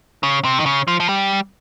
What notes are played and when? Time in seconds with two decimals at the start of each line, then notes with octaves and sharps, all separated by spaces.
0.23 C#3
0.45 C3
0.60 D#3
0.66 C#3
0.88 F3
1.00 F3
1.09 G3